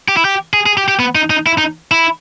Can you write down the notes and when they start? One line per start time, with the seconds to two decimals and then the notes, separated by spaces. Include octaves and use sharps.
0.08 G4
0.17 E4
0.25 G4
0.53 G#4
0.66 G#4
0.78 G4
0.88 G4
0.99 B3
1.15 D#4
1.30 D#4
1.46 E4
1.58 D#4
1.91 E4